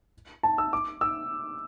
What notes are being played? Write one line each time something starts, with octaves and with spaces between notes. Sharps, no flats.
A5
E6
D6
E6